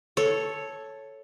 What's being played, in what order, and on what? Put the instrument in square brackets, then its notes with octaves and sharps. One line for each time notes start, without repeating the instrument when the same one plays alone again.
[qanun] A4 C#5